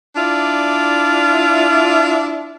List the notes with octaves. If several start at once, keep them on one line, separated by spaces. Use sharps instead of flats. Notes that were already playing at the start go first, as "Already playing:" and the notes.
D4 E4 F4 D5